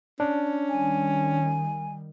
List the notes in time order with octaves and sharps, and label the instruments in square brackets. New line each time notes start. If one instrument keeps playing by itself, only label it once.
[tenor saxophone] C#4 [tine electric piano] D4
[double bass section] D#3 G3 [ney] G#5